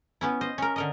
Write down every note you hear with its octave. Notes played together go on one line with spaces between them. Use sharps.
B3 C#4 E4
C5 D#5
C#4 A#4
D3 A#4 D#5